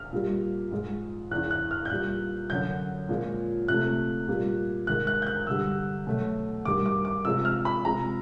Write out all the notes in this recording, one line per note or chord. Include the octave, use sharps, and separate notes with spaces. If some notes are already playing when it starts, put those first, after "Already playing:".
Already playing: F6
A#2 G3
G#2 F3 G#3
E2 C#3 E3 F#6
F#6
F6
G6
A#2 G3 F#6
F#2 D3 F#3 G6
A#2 F3 G#3
C3 F3 A3 F#6
A#2 G3
G#2 D#3 G#3 F#6
F#6
G6
F#6
G2 D3 G3 E6
B2 F#3 A3
G2 D#3 G3 D6
D6
D6
C3 F3 G#3 E6
F6
B5
C3 F3 G#3 A#5